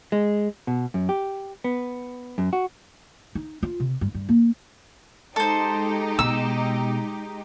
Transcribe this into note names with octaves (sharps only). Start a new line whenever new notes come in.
G#3
B2
F#2
G4
B3
F#2
F#4
D#4
F4
C3
G2
G2
A#3
G#3 D#4 G4 A4 C5
B2 E6